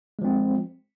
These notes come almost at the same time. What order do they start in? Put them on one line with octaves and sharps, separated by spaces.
G#3 F3 C4